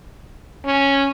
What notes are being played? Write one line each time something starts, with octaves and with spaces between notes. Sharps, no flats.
C#4